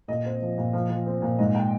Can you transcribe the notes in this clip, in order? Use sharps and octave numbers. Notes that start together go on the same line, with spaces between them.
A#2 D#5
C4
F3
A#2
F3
F3
C4
A#2
G#2 D#5
G5